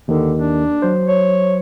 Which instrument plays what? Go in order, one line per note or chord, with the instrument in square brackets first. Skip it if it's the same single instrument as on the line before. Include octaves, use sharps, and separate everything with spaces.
[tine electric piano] D#2 D#3 [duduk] D3
[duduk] D4
[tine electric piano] F#3 C5
[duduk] C#5